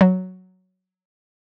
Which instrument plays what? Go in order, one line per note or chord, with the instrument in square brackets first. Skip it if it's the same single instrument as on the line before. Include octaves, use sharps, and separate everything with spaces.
[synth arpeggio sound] F#3